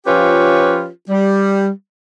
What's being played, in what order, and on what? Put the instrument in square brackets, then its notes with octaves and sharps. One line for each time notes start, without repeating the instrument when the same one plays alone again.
[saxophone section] F3 C#4 F4 G4 B4 C#5
G3